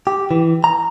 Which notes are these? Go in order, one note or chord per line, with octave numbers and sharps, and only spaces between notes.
G4
E3
A#5